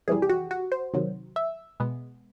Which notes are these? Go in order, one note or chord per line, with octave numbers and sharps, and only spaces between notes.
F2 C3 E3 G3 G#4
G4
F#4
F#4
C5
C3 D#3 F#3
E5
B2 G#3 B3